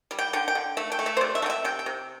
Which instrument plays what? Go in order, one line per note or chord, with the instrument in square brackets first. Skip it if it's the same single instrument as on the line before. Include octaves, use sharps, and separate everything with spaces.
[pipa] G3
G5
D3 G5
G5
D3
A3 E5
G5
A3
E5
C5
C3 D5
E5
A3
G5
E5
C3 G5
G5
C3